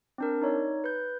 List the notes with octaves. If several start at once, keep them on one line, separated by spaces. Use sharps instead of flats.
C4 D4 A#4
D#4 C#5 D5
B4 G6